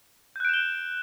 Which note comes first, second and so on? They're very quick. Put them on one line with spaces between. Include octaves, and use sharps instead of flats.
G6 F#6 D7 E7 G7